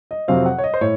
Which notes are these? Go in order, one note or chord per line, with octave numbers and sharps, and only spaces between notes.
D#5
F2 C3 F#3 C4 F5
F#5
C#5
D#5
C5
A2 C#5